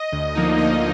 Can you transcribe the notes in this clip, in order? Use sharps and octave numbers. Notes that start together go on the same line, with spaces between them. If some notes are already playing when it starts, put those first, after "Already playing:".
Already playing: D#5
D2
D3 F3 A#3 D#4
D2 D#5